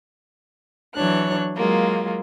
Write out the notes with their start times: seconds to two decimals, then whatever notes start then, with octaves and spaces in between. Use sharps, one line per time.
0.94 E3 F#3 D4 C#5 F#6
1.57 F#3 G#3 A#3 F4